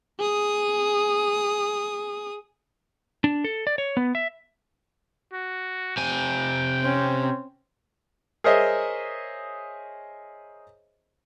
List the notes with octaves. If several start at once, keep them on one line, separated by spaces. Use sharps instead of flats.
G#4 D#6
D4
A4
D5
C#5
B3
E5
F#4
C3 G5 G#5
C4 C#4
G#4 A#4 C5 C#5 D#5 E5